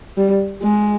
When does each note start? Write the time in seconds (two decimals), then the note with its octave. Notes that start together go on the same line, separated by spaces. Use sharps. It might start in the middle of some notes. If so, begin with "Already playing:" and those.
0.17 G3
0.63 G#3